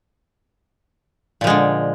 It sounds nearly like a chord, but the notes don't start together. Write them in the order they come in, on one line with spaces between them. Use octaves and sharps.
A#2 F3 G#3 D3